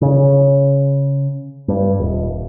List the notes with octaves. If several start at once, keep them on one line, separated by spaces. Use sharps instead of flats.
C#3
G2
D#1